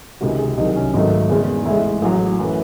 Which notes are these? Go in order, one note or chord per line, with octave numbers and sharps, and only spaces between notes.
C#2 C3 D#3 G#3 F#4
G#4
C2 C3 D#3 F#3 D#4
C#4
G#1 G#2 D#3 F#3 A3 D#4
E2 C#3 G#3
A1 A2 G#3 E4
A1 A2 F#3 G#4
F#2 E3 A3